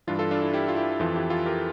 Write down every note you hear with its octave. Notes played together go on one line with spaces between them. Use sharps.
G2 E3 D4 F4
F4 A4
D4 F4
E4
E4 G4
F4
E4 G4
F2 E3 F4 A4
E4 G4
F4 A4
G4 A#4